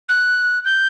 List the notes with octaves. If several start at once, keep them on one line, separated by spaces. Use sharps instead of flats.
F#6
G6